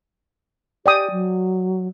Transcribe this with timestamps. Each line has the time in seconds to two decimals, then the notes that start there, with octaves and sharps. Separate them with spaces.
0.86 G4 D5 G5 D#6
1.11 F#3